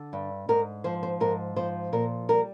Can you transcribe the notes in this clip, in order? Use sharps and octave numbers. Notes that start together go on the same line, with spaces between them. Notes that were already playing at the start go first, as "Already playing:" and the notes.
Already playing: D3
G2
G#2 A#4
F3 C5
C5
G#2 A#4
F3 C5
A#2 A#4
G3 A#4